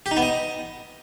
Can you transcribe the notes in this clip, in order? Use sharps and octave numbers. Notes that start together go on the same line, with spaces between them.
G4
D#4
B3
D#5